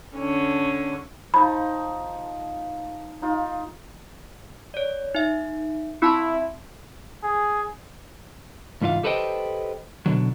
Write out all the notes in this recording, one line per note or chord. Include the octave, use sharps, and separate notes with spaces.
D3 C#4
F3 D#4 B5
D#4 F4
C#5 D5
D#4 E5
C4 E4 A5 C6
G#4
C#2 G#2 E3 F4 F5
G4 A4 B4 C5 D#5 G5
B2 D3 D#3 F#3